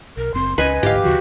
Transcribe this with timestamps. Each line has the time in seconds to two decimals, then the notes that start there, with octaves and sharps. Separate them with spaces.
0.17 B1 A#4
0.34 F#1 C4 C6
0.58 C#2 C#4 B4 D#5 G#5
0.83 A1 D2 G#2 G4 F5
1.03 D#2 C#3 F3 F#4